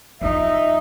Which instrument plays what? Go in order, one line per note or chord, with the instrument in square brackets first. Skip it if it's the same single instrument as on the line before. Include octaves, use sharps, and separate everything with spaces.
[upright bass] F2 F3 [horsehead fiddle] D#4 [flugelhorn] E5